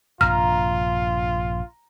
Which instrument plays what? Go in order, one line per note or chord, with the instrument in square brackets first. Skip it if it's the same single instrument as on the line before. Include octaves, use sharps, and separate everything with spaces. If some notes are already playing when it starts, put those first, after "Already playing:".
[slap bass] A#1 G2 C3 [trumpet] F4 [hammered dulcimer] A#5 [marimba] F6